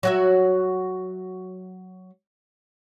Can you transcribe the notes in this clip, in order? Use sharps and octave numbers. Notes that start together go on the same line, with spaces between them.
F#3 F#4 E5